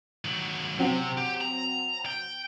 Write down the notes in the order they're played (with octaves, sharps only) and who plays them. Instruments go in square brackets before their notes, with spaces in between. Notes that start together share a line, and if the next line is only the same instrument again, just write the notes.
[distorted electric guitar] D#3 F#3
[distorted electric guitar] C3 [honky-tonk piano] F#3 C4
[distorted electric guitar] G4
A#5
G5